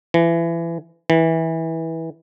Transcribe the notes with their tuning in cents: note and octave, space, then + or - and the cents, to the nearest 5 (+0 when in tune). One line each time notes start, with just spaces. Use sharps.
E3 +25
E3 -20